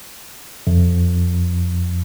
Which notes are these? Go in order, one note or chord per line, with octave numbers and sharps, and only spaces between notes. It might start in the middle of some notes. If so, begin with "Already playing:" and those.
F2